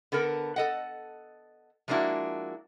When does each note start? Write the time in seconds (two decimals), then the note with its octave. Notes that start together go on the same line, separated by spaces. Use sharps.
0.12 D3 B3 A4 A#4
0.56 A4 D#5 F#5
1.88 F3 G#3 A#3 D4 E4 F#4